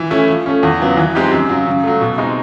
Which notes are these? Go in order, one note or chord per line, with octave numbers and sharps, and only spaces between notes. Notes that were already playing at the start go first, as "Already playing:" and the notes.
Already playing: E3
A3 C#4 E4
F3
A3 C#4
E2
C#3 F#3 B3
E3
G#3 C4 D#4 G4
F#2
C#3 F#3
C#3
F#3 A3
B2
G#3 C4 D#4